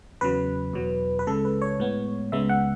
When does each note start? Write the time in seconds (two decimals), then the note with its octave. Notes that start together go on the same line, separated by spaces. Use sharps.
0.21 E2 C#3 F#3 B4
0.73 E2 B2 F#3
1.19 B4
1.27 C#2 C#3 G#3 A4
1.45 B4
1.62 C#5
1.79 A2 G#3 B3
2.32 C#2 C#3 G#3 B3 E5
2.49 F#5